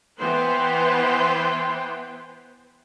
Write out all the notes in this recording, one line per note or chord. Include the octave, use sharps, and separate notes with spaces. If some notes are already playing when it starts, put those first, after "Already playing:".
E3 B3 B4 C5 G5 C6